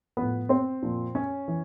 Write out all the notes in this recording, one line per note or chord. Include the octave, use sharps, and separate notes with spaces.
F3 B3 B4
A2
C4 C5
A#2 F3
C#4 C#5
E3